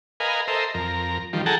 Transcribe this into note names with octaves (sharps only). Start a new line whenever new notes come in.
A#4 B4 D#5 F5 G#5
A4 A#4 C5 D#5 E5
F2 A#4
D#3 F3 G3
G#4 A4 F#5 G5 A5 A#5